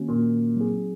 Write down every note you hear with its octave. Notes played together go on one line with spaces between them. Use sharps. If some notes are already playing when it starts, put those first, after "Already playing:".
Already playing: D#3 A#3 C#4 F#4
A#2
F#3 C4 D#4 G#4